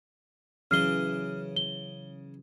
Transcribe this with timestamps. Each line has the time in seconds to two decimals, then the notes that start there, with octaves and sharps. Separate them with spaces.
0.71 C#3 E3 F#3 C#4 D#5 F6 C7 G7
1.56 G7